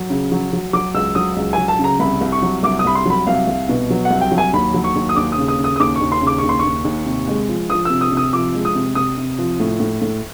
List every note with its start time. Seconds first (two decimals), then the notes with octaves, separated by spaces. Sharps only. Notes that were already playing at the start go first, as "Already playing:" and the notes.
Already playing: F#3
0.10 C#3
0.32 F#3
0.53 F#3
0.73 F#3 D6
0.95 C#2 E6
1.15 F#3 D#6
1.37 C#2
1.53 F#3 G#5
1.68 A5
1.79 C#3
1.84 A#5
2.00 C2 B5
2.21 C2
2.32 C#6
2.42 F#3
2.63 C2 D6
2.79 D#6
2.85 C2 B5
2.95 C6
3.06 F#3 B5
3.27 C2 F5
3.47 C2
3.69 B2
3.90 F#3
4.05 F#5
4.11 C2
4.21 G5
4.32 F#3
4.38 G#5
4.53 D#2 B5
4.74 F#3
4.84 C#6
4.96 D#2
5.09 D#6
5.16 D#2 D6
5.32 D#6
5.38 C#3
5.48 D#6
5.58 C#3
5.64 D#6
5.76 D#6
5.80 D#2 D6
5.96 C#6
6.01 D#2
6.12 C6
6.21 C#3
6.27 D6
6.38 D#2 C#6
6.49 C6
6.59 C#6
6.64 D#2
6.85 D#2
7.06 C3
7.27 G#3
7.49 F3
7.69 F3 D#6
7.85 C3 E6
8.01 D#6
8.12 C3 D#6
8.33 F3 D6
8.54 G#3
8.65 D#6
8.75 C3
8.95 C3 D#6
9.17 C3
9.38 F3
9.60 A2
9.80 A2
10.02 A2